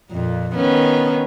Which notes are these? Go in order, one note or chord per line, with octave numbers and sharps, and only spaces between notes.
F2 A#2
D#3 B3 C#4